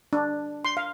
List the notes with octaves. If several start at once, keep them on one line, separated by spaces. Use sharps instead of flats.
D4
C6
F5